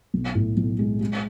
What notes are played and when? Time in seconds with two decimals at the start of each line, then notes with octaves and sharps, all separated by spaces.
0.14 B1
0.35 A2
0.57 B1
0.79 G#3
1.01 G#3